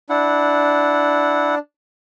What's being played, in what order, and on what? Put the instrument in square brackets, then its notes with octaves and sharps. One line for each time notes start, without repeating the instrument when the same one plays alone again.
[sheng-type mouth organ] D4 [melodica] E4 F#5